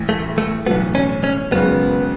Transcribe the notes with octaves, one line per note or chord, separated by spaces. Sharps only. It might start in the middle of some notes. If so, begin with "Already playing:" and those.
Already playing: A1 A2 E3
A3
A3
B1 A2 E3 A3 B3
C#4
C#4
G#1 F#2 C#3 B3